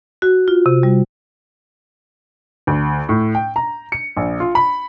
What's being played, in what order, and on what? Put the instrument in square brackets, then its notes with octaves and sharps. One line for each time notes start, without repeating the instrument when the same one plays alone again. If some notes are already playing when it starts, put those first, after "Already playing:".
[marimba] F#4
F4
C3
G3
[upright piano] D2
A2
G5
A#5
C#7
A#1
F4
B5